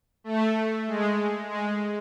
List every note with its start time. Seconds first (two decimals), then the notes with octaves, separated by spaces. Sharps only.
0.24 A3
0.87 G#3
1.49 G#3